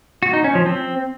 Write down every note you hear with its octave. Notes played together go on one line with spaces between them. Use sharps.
F#4
D#4
C#4
F3
C4